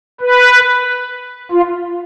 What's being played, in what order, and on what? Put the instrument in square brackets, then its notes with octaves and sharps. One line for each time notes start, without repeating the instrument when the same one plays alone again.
[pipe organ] B4
F4